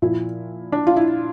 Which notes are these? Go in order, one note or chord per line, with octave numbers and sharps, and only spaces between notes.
A#2 F3 E4
D4
F4
E4